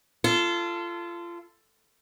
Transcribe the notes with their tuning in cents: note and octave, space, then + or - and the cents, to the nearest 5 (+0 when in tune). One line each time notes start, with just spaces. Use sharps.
F4 -25 A4 +10